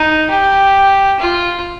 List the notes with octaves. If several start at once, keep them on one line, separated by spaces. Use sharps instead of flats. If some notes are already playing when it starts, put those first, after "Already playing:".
Already playing: D#4
G4
F4